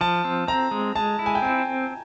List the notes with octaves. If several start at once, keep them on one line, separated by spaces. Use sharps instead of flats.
F3 A5
C4
C4 A#5
G#3
G#3 A5
E4
G#5
G5
C4 G#5